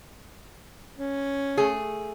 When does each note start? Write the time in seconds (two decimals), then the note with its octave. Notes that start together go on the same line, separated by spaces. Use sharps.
0.98 C#4
1.57 A3 G#4